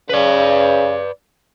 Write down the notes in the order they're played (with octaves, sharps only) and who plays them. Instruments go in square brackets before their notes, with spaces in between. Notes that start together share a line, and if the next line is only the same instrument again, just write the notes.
[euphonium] C#3 [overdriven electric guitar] B4 D5